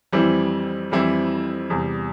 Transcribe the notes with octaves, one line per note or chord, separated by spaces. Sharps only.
F2 E3 G3 C4 E4
F2 E3 G3 C4 E4
E2 C3 G3